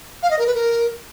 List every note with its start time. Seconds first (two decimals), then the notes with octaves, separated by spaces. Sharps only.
0.23 F5
0.31 D#5
0.39 A#4
0.47 B4
0.55 A#4